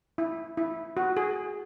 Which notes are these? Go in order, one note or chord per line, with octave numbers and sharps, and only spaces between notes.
E4
E4
F#4
G#4